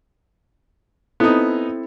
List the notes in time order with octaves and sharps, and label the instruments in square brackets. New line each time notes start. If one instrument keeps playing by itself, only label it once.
[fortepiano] B3 D#4 [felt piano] C4 E4 A4